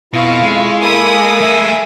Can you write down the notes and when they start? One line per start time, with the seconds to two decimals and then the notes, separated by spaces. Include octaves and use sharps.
0.13 F2 B2 E4 F4 F5 C#6
0.42 G#3
0.80 A#3 A4 G#5 B5 D#6
1.41 A3 G#4 E5